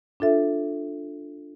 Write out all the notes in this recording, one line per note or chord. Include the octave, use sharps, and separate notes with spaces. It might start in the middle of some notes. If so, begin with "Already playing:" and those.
D4 F4 A4 E5